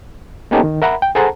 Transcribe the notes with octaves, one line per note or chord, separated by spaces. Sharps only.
A#3 B3 C#4 D#4 G4 A4
D#3
A#4 E5 F#5 A#5 B5
G5
G#4 A4 C5 F#5 A5 A#5